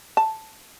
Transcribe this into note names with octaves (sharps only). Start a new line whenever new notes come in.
A5